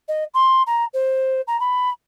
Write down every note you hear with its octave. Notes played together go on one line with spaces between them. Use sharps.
D#5
C6
A#5
C5
A#5
B5